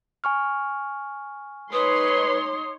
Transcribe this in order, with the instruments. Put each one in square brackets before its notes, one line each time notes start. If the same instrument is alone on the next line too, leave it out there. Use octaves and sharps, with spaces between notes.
[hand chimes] G#5 C#6 F6
[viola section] D#4 C#5 C6 [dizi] B4 [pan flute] D#6